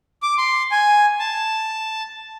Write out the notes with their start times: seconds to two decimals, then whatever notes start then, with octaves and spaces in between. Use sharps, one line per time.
0.22 D6
0.38 C6
0.71 G#5
1.19 A5